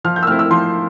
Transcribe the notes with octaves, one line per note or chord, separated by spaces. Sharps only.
F3 F6
G6
E6
A3 C4 E4 F6
E6
F3 C6